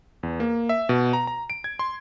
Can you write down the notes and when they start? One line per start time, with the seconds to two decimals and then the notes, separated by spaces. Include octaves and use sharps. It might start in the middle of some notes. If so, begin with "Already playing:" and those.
0.23 E2
0.40 A#3
0.69 E5
0.89 B2
1.13 A#5
1.27 A#5
1.50 D7
1.64 G#6
1.79 C6